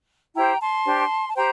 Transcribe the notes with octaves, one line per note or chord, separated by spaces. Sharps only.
E4 G4 C5 G5 A#5
A5 C6
D4 G4 C5
A5
G4 C5 G5 A#5